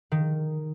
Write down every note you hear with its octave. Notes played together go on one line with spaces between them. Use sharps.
D#3